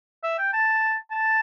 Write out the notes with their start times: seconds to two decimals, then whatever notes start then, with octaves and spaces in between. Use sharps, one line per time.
0.23 E5
0.38 G5
0.53 A5
1.11 A5